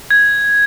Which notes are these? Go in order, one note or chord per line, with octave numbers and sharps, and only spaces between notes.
G#6